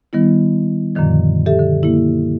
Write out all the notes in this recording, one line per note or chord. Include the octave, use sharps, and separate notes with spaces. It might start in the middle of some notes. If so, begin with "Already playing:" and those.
D#3 G3 B3 E4
F#2 A#2 D3 D#3 F3
G4 A4 E5
D3
A#3 E4